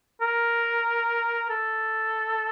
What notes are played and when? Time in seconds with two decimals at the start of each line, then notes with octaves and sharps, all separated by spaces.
0.21 A#4
1.50 A4